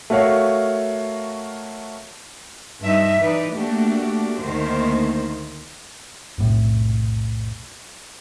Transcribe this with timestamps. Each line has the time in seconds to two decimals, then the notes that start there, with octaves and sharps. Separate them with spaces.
0.10 A3 F#4 A#4 C#5 F5
2.83 G2 D#4 E5
3.19 E3 D#4 B4 D5
3.52 A3 A#3 D4 F#4 G4
4.40 D2 D#3 A#3 C5
6.38 F1 B1 A2 A3